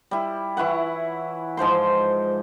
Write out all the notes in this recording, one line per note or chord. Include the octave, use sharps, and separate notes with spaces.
G3 E4
E3 E4 C#5 F#5
G#2 F3 C5 C6